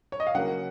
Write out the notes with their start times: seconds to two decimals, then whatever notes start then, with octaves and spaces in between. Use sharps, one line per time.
0.12 C#5
0.20 D#5
0.27 F5
0.35 C#3 F#3 A#3 F#5